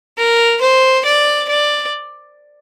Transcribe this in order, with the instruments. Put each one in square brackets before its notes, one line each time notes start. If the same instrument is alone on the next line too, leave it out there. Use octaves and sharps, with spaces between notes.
[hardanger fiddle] A#4
C5
D5
D5